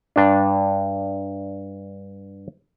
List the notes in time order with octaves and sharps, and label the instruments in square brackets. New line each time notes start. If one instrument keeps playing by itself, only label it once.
[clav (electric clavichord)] G2 D4